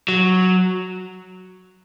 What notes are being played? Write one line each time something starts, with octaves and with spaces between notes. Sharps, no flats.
F#3